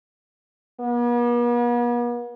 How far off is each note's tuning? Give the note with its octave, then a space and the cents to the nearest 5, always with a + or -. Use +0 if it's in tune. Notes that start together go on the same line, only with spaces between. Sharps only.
B3 -45